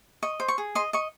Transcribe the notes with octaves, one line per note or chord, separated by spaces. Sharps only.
D#5 C#6
C5
C#6
G#4
D#5 C6
D#5 C#6